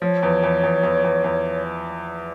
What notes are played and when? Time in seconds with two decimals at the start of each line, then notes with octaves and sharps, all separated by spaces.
0.02 F3 C#5
0.23 E2
0.43 E2
0.63 E2
0.83 E2
1.04 E2
1.24 E2